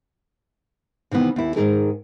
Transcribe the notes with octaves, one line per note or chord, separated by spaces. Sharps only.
C3 D#3 E3 B3
D#2 E4
G#2 B2 D#3 D#4 G#4 A#4